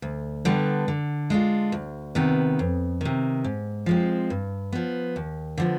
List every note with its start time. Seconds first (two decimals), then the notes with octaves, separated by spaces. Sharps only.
0.02 D2
0.45 D3 G3 B3 D4
0.88 D3
1.30 G#3 D4 F4
1.72 D2
2.15 C3 D#3 B3
2.59 F2
3.01 C3 D#3
3.44 G#2
3.86 F3 G#3 C4
4.30 G2
4.72 F3 B3
5.16 D#2
5.58 D3 F3 B3